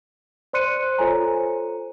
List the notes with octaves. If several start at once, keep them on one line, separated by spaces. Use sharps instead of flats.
C5 D5 C6 F#6 C#7 D#7
F4 A4 C5 C#5 G#5 A#5